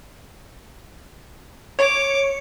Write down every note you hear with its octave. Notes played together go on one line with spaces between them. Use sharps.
C#5 D6